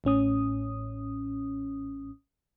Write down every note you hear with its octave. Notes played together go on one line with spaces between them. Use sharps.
A1 A2 C#4 D#6